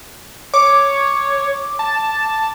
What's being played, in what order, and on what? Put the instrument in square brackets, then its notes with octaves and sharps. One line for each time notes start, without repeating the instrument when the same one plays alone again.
[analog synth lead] C#5 [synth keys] D6
[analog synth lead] A5